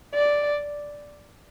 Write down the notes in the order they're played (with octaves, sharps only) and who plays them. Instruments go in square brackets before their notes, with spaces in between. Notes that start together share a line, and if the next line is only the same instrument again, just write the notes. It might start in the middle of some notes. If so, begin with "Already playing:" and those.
[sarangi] D5